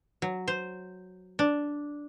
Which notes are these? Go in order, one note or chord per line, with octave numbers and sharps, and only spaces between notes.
F#3
C5
D4